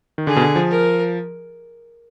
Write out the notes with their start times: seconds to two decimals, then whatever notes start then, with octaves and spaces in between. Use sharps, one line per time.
0.18 D#3
0.27 D3 G#4
0.36 B2
0.41 D3
0.56 F3
0.71 A#4